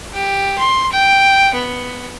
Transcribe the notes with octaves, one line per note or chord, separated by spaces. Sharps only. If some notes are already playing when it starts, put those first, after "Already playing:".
G4
C6
G5
B3